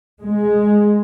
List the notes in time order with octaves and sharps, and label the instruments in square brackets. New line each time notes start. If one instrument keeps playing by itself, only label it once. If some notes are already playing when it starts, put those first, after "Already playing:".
[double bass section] G#3